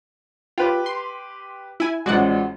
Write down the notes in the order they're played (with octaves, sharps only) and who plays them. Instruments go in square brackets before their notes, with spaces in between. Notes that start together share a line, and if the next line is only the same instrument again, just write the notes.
[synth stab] F4 [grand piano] G4 B4 G5
[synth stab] C6
E4 G#5
[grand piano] A1 F3 G#3 [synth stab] F#4 D5 F#5